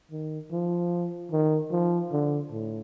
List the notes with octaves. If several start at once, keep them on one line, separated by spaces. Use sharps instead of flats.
D#3
F3
D#3
F3
D3
A2